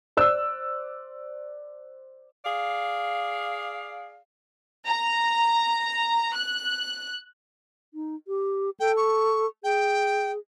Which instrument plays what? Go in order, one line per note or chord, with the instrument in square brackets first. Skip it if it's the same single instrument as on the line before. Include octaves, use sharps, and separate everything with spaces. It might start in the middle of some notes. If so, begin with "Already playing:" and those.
[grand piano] C5 D5 E6 F#6
[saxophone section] G#4 D5 F5
[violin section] A#5
F#6
[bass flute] D#4
G4
[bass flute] A4 [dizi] G5
[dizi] C#6
[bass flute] G#4 [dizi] G5